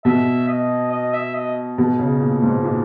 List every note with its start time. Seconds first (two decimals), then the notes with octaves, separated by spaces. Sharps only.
0.05 B2 E5
0.48 D#5
0.92 D#5
1.14 E5
1.35 D#5
1.78 B2
1.99 C#3
2.20 A#2
2.42 G#2
2.64 A#2